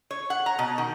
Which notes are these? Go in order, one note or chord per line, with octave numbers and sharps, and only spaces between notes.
C#5
F#5
A#5
B2
D#3